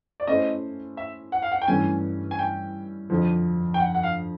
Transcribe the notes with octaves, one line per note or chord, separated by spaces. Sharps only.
D5
A3 C#4 E4 A4 C5 D#5
E5
F#5
F5
F#5
G5
G2 E3 A3 C#4 G#5
G#5
G5
F2 D3 F3
G5
F#5
F#5
F5